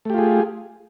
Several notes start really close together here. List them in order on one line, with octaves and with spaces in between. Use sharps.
A3 G4 F4 G#4